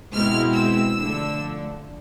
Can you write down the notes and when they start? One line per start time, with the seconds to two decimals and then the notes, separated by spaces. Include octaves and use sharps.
0.12 B2 G#3 C4 E4 F6
0.53 E6
0.96 D3 F3 A3